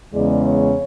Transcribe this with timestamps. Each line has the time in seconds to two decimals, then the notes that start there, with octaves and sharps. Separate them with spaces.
0.14 E2 C#3 G#3 D5
0.44 C#5